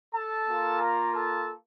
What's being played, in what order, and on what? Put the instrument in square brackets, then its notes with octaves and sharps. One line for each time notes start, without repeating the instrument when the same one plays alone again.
[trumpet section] A4 A5
A#3 F4
A#4 A#5
A4 A5